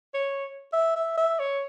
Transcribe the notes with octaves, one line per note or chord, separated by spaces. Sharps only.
C#5
E5
E5
E5
C#5